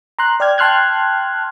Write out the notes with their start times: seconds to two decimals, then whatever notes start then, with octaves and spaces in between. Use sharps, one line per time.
0.19 A#5 C6 F#6
0.40 D5 G5 F6 G#6
0.58 G5 A5 C6 F6 F#6 G#6